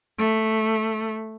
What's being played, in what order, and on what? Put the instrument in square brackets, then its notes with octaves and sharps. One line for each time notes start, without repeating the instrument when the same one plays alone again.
[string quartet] A3